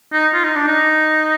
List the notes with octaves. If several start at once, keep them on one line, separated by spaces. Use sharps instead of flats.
D#4
F4
D#4
D4
D#4